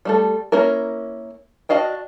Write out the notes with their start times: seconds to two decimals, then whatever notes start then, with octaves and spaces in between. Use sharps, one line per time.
0.05 G3 A3 A4
0.52 A#3 C#4 E4 A#4
1.69 D4 F#4 D#5 F5 G5